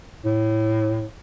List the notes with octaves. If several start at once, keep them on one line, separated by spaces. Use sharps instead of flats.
A2